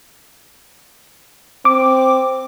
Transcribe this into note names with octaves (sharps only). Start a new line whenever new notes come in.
C4 D6